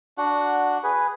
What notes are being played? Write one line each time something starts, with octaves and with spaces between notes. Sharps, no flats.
D4 F#4 F#5
G#4 B4